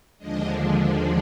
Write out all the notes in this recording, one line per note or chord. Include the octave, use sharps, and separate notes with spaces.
D#2 D3 F3 G#3 D4 D#5